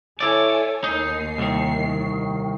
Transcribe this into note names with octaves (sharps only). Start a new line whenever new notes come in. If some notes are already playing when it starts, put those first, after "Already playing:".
E4 A4 C#5 D5 G#5
D#2 D#4 C7
C2 D#3